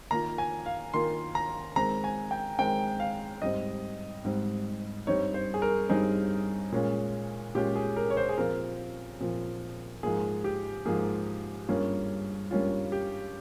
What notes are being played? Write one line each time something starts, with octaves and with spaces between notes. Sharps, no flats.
D#3 A#3 F4 A#5
G#5
F5
D#3 A#3 F4 C6
A#5
D#3 G#3 C4 A#5
G#5
G5
D#3 G#3 C4 G5
F5
G#2 G3 C4 D#5
G#2 G3 C4
G2 G3 C4 D#4 C#5
C5
G#4
A#4
G2 G3 C4 D#4 G#4
A#2 G#3 C#4 F4
A#2 G#3 C#4 F4 G4
G#4
A#4
C#5
C5
G#4
A#2 F3 C4 F4 A#4
A#2 F3 C4 F4
G#2 F3 A#3 G#4
G4
G#2 F3 A#3 G#4
G2 G3 A#3 C#4 F4
G2 G3 A#3 C#4 F4
G4